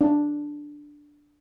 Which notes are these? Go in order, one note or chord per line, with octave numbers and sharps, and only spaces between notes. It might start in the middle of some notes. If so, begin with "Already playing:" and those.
D4